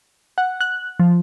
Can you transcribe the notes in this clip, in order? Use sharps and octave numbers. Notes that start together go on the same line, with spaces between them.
F#5
F#6
F3